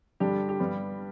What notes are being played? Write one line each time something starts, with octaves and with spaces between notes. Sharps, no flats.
G2 D3 G3 D4 G4
G4
G2 G3 B3